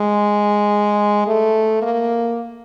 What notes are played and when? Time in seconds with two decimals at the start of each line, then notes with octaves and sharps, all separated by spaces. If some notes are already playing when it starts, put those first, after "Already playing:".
Already playing: G#3
1.27 A3
1.82 A#3